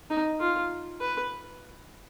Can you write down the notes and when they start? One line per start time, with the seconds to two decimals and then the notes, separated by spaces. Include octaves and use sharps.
0.10 D#4
0.40 F4
1.01 B4